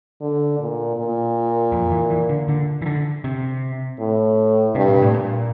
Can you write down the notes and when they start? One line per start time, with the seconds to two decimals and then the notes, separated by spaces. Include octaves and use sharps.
0.21 D3
0.59 A#2
0.96 A#2
1.72 F2
1.91 E3
2.10 E3
2.29 D3
2.48 D3
2.82 E3
2.86 D3
3.24 C3
4.00 A2
4.75 G2 C3
4.88 A#2
5.02 A2
5.13 A#2